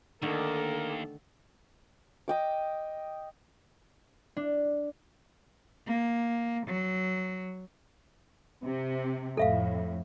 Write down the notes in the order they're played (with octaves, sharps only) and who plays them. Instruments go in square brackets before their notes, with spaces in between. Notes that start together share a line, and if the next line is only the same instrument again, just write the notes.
[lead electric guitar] D#2 [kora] D3 D#3 A3 [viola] A4 [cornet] A#4
[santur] D#5 G5 D6
[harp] D4
[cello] A#3
F#3
[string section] C3
[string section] F2 A2 [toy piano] A4 E5 F5